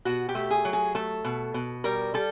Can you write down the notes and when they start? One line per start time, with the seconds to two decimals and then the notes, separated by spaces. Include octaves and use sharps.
0.05 B2 F#4
0.29 G4
0.35 A3
0.51 G#4
0.65 F#3
0.73 G#4
0.95 A3 A4
1.25 B2
1.54 B2
1.84 G3 A#4
2.14 G3 A4